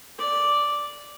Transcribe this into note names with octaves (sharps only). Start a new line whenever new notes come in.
D5